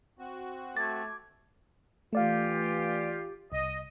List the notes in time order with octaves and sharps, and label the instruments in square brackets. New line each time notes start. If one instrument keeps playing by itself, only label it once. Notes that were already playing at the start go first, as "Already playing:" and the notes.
[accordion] C4 F#4
[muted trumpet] A3 [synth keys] D6 G#6 [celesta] A6
[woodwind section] E3 F4 G4 [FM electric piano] A3 D5 F5
[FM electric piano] C2 [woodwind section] D#5